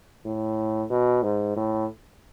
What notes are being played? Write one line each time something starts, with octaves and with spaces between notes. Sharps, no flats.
A2
B2
G#2
A2